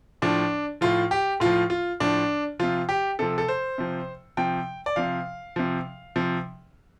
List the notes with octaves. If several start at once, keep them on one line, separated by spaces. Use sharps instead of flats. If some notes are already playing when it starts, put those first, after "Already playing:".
A2 F3 D4
A2 F3 F4
G4
A2 F3 F4
F4
A2 F3 D4
C3 F3 F4
G4
C3 F3 A4
A4
C5
C3 F3
C3 F3 G5
D5
C3 F3 F5
C3 F3
C3 F3